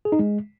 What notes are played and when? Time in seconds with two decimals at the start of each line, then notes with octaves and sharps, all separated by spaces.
0.05 G#4
0.12 D#4
0.19 G#3